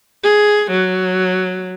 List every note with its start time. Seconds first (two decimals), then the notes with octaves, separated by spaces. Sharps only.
0.23 G#4
0.71 F#3